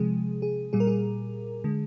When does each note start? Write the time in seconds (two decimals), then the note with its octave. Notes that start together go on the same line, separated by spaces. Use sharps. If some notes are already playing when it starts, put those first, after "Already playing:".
Already playing: C3 F3 G#3 G#4
0.42 G#4
0.73 A#2 G3 G#4
0.80 A#4
0.87 G#4
1.64 D3 G#3